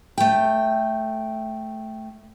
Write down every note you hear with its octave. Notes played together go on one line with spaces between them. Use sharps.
A3 G5